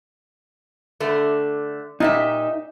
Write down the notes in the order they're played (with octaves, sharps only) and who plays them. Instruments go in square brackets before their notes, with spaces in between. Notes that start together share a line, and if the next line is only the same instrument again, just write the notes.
[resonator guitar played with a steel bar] D3 A3
[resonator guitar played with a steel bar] A#2 G4 E5 [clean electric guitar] D#4